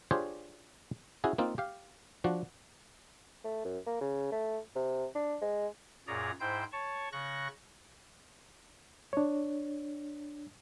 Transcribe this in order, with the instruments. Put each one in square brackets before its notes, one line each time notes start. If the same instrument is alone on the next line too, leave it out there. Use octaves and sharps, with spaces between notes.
[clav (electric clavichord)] D4 F4 G4 G#4 C5 C#5
C#4 E4 F#4 G#4
A#3 C4 D#4 F4
G4 F5
F3 D4 F#4
[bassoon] A3
F#2
A#3
C#3
A3
C3
D4
G#3
[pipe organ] F#2 A#2 G#4 C#5 D5 A#5
G#2 E4 C5 G5 G6
C#5 A5 C#6
C#3 C#6 F#6 A#6
[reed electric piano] D4 C#5